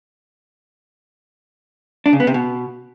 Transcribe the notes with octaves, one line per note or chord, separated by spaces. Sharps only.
D4
C#3
B3
C3
B2